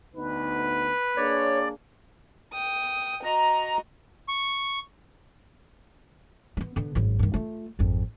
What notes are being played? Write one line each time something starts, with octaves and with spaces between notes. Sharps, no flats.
D2 B3 D#4 B4
A#3 D4 G#4 C#5 D5
G5 D#6
F#4 D#5 A#5
C#6
A#3 B3
D3 B3
G#1 F#2
G2 D#3
A3 F4
G#1 F2